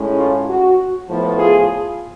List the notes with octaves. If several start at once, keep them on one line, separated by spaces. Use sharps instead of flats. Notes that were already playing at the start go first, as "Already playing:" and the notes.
Already playing: A2 G#3 C#4
F4
F#4
A2 F3 B3
F4 G#4